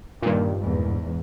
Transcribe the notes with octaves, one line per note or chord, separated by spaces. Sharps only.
G2 A#2 D#3
E2 G#2